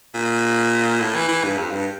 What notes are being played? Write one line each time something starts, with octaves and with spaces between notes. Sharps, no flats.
A#2
A2
E3
E3
G2
F2
G2